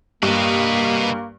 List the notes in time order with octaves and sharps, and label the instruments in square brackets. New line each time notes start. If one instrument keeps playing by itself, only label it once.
[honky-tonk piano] G2 [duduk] A#3 [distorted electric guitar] B4 D#5